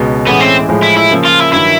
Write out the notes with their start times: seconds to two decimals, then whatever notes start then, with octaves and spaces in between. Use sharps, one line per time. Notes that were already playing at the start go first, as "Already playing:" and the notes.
Already playing: C#2 B2 G#3
0.27 A2 E3 G#3 B3 C#4
0.40 C4
0.69 A2 F3 G#3
0.83 E4
0.97 E4
1.11 C#3 F3 A#3
1.25 F4
1.40 E4
1.53 G2 D#3 F#3 E4